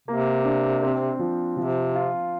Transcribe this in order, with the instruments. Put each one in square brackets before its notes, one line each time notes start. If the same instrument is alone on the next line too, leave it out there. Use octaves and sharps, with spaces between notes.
[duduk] C3 [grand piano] A#3
[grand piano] D4
C4
F3
[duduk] C3 [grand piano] F3
[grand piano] F4